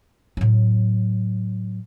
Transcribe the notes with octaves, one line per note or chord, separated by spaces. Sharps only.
A2 F#3